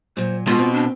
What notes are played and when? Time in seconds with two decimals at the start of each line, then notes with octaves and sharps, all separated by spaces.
0.17 A#2 F#3 C5
0.47 B2 G#3 F4 D#5 F#5
0.59 C4
0.73 D4